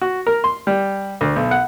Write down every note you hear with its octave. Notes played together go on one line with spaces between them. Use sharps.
F#4
A#4
C6
G3
D2
B1
F#5